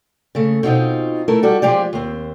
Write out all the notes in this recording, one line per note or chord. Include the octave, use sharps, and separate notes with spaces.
C#3 A3
B2 C4 D#4 F4
A3 E4 A4 A#4
G3 F#4 A4
F3 G#3 G4 D5
D#2 C4